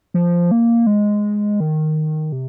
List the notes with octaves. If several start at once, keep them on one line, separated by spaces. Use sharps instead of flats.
F3
A#3
G#3
D#3
C3